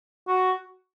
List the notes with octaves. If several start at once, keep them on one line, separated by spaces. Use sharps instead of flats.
F#4